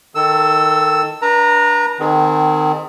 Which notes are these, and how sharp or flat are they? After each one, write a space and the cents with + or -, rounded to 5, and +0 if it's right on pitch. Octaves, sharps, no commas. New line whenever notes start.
D#3 +0 A4 +20 E6 +0
D4 +0 B4 -40 A#5 -10
D#3 -25 C4 -35 G#4 +0